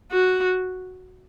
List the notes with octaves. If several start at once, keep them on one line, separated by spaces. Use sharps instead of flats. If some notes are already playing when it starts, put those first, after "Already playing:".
F#4